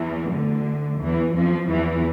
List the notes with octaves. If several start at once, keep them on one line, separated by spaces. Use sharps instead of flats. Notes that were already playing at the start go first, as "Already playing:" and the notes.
Already playing: E2 E3
D2 D3
E2 E3
F2 F3
E2 E3